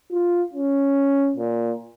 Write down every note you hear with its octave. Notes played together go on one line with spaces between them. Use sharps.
F4
C#4
A#2